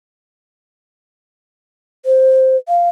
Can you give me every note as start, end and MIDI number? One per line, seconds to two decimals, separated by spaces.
2.06 2.57 72
2.69 2.89 77